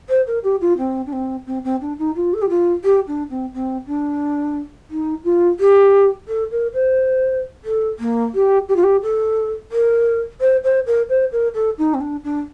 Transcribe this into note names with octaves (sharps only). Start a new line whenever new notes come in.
C5
A#4
G4
F4
C4
D4
C4
C4
C4
D4
D#4
F4
A4
G4
F4
G4
D4
C4
C4
D4
D#4
F4
G4
A4
A#4
C5
A4
A#3
G4
G4
F4
G4
A4
A#4
C5
C5
A#4
C5
A#4
A4
D#4
C4
D4
D4